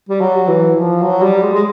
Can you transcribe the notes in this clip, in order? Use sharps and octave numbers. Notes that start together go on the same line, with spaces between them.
G3
F#3
E3
F3
F#3
G3
G#3
G#3